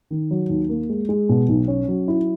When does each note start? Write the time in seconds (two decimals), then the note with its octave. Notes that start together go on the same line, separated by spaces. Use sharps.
0.11 D#3
0.31 F#3
0.49 D#2
0.69 A#3
0.90 G#3
1.09 G#3
1.29 B2
1.49 B1
1.68 C#4
1.88 F#3
2.08 E4